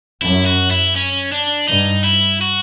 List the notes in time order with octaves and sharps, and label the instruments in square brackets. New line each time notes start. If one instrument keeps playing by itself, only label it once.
[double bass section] F#2 [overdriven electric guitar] E4
[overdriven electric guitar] F#4
E4
C#4
D4
[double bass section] G2 [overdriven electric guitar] D#4
[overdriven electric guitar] E4
F#4